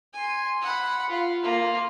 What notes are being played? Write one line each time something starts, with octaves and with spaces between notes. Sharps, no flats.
G#5 C6
F#5 B5
F4
A#3 F4